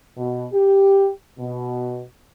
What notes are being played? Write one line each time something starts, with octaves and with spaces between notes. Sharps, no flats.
B2
G4
B2